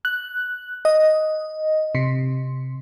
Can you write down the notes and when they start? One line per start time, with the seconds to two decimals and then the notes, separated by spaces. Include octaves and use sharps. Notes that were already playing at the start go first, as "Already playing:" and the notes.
0.05 F#6
0.85 D#5
1.95 C3